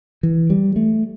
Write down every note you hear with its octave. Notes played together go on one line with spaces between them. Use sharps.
E3
G3
A3